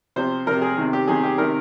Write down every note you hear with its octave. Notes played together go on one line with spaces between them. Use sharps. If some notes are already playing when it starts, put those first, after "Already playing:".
C3 F3 C5
C3 F3 A#4
G#4
C3 D#3
G4
C3 D#3 G#4
G4
C3 D#3 A#4